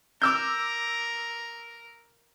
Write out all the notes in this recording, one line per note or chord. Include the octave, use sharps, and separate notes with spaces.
A#4 D6 E6 G6